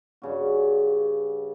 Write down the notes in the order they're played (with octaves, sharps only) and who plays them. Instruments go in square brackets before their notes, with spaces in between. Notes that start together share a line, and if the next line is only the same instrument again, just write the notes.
[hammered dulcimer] G2 C#3 F#4